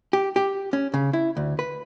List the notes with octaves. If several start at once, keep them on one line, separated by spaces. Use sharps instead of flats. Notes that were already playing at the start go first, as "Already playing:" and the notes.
G4
G4
C#4
C#3
E4
D2
B4